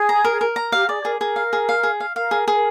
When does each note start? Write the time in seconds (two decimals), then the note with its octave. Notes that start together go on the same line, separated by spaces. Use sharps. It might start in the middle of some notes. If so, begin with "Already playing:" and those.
Already playing: G#4
0.09 A#5
0.24 A#4
0.41 A#4
0.56 A#5
0.72 G4 F5
0.88 G#4 D5
1.04 G#4 A#4
1.20 G#4 A#4
1.36 F5
1.53 G#4
1.69 F5
1.83 G#4
2.00 F5
2.16 A#4 F5
2.31 G#4
2.48 G#4